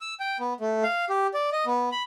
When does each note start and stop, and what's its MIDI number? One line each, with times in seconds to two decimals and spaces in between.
0.01 0.14 88
0.20 0.37 79
0.40 0.53 59
0.60 0.83 57
0.84 1.05 77
1.10 1.27 67
1.34 1.50 74
1.53 1.65 75
1.66 1.89 59
1.92 2.03 83